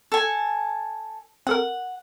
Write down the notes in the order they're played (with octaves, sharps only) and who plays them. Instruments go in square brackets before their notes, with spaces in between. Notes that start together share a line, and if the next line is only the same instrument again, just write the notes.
[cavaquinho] A4 G#5
[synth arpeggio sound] C4 A4 A#4 [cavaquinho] F#5